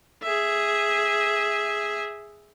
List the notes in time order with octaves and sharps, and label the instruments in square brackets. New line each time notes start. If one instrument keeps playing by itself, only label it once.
[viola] G#4 E5